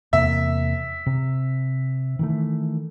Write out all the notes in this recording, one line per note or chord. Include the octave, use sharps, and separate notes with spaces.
E2 C3 A#3 E5
C3
D#3 E3 A3